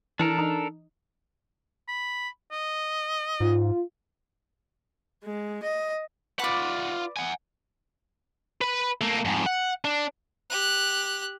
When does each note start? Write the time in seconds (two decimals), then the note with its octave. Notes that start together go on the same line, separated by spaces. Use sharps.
0.19 E3 D4 A4 A#4
0.38 D#4
1.88 B5
2.52 D#5
3.41 G#2 F4
5.24 G#3
5.62 D#5
6.39 F4 B4 C#5 D5 F#5
7.17 F#5 G#5
8.61 B4 B5
9.01 A3 A#3
9.25 F2 G#2
9.46 F#5
9.85 D4
10.50 G4 F#6